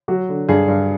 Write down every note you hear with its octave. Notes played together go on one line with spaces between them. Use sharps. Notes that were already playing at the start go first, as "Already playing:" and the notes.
F#3 F#4
D3
G2 G#4
G2